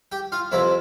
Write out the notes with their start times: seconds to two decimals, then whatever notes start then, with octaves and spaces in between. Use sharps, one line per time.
0.12 G4 G5
0.32 F4 F5
0.52 F2 C3 F3 E4 E5